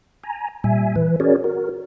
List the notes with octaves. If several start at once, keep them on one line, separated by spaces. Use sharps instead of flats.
G#5 A#5
A#2 G3 E5 G#5
E3 B4
C#4 F#4 G#4 A#4 C#5 D5
F#4 A#4